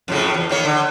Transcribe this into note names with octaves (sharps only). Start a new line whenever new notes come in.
F2 A2 C#3
E2
D#3 A#3 C#5
D3